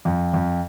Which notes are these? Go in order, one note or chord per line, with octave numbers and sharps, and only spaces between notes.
F2
F2